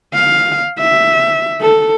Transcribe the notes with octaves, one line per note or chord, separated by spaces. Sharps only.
F5
E5
A4